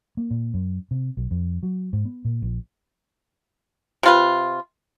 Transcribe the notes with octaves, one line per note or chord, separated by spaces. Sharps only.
A#3
A#2
F#2
C3
B1
F2
F#3
G#2
B3
A#2
A#1
C3 F4 B4